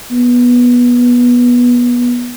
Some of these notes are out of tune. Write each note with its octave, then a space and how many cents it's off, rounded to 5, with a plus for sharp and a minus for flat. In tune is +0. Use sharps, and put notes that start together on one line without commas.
B3 -20